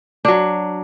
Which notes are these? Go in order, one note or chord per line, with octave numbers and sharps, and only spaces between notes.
F#3 D4